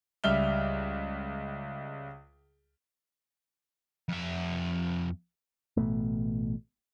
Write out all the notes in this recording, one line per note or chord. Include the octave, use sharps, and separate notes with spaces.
C#2 G3 E5 F6 G7
F2 E5
A1 B2 A3